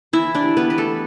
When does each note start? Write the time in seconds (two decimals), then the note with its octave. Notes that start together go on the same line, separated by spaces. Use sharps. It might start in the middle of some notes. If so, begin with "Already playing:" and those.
0.13 E3 E4 E5
0.35 D4 D5
0.43 G3
0.57 B3 B4
0.70 E3 B4
0.78 A3 A4